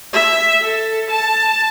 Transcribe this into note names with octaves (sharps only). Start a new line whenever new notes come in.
E5
A4
A5